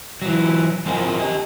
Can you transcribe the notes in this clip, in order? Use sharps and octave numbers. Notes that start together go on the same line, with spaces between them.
E3 F#3
F3 C4 F4 A#4 D#5 G#5
G4 D#5